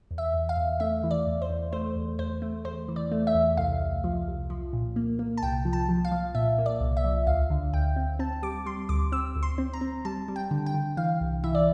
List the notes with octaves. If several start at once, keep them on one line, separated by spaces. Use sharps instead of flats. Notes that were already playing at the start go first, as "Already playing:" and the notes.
E2
E5
E2
F5
E2
A3 E5
E3
D5
E2
C5
E2
A3 C5
E2
E2 C5
A3
E2 C5
E3
D5
A3
E5
E2
C2 F5
C2
F3
C2
F3
A#2
A#3
A#3
A5
C2 G5
F3
A5
F3
F5
F3
A#2 E5
A#3
D5
C2
E5
F3
D2 F5
D3
D2 G5
C4
C4 A5
G3 D6
G3 C6
D2 D6
C4 E6
D2
C6
C4
A#5
C4
G3 A5
G3
G5
D3
G5
D3
E3 F5
C2
E3 E5
D5